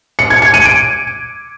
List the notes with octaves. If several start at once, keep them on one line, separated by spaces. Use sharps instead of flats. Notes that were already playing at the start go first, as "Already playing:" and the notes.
C#7
G#6
C#7
D#7
D7